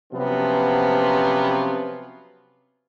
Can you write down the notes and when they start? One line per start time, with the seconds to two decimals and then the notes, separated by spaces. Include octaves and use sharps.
0.12 C3 F3 F#3 B3 C#4 F4